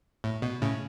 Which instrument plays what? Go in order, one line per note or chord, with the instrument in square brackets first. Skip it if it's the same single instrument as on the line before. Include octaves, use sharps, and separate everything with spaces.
[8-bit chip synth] A2
B2
A2 C#3